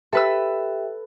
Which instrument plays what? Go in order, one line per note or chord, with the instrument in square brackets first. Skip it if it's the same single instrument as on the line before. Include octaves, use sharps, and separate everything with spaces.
[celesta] G4 E5 G5 [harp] A4 B4 E6